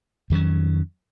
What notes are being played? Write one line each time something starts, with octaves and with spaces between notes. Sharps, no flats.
F2 D#3 F#3 C#4